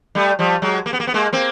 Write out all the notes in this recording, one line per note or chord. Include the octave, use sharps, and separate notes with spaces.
G3 A3
F3 G3
F#3 G#3
A#3
B3
A#3
B3
G#3 A#3
A#3 C4